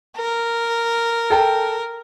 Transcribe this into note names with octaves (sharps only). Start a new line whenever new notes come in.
A#4
A4 G5 A5